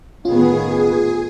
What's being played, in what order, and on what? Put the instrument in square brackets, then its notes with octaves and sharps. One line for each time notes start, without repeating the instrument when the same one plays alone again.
[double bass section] A2 D#3 B3 [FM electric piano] C#4 F4 [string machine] G#4